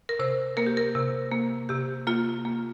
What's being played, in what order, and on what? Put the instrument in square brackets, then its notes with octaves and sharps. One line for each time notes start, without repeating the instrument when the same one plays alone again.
[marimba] A#4
C3 C5
A#3 A#4
G4
A#4
C3
A#3
C3 G4
A#3 F4
A#3